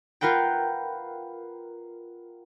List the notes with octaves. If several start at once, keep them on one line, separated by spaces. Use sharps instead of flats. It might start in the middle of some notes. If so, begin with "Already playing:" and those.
F4 A#4 B4 F#5 G5